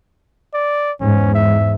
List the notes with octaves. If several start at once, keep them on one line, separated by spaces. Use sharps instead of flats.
D5
E2 G#2 C#4
E5